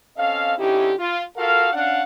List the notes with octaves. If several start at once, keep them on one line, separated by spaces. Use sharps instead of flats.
C4 C#4 A4 D#5 F5
D3 C#4 D#4 E4 G4
F4
F4 F#4 A4 A#4 F5
C#4 D4 F5 F#5